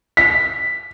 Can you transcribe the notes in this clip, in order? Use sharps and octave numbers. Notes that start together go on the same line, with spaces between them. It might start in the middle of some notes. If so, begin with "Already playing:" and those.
B6